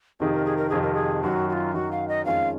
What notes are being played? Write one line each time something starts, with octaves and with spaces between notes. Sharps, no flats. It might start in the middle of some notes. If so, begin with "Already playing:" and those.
F2 C3 D#3 G#4
A#4
G#4
A#4
F2 C3 D#3 G#4
A#4
G#4
F#2 D#3 F#3 F#4
F#4
F4
F#2 D#3 F#3 F#4
F5
D#5
F2 D#3 G#3 C#4 F4 F5